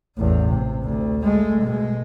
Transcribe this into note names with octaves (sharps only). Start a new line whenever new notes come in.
A1 E2
C3
D2
G#3 A3
B2 G#3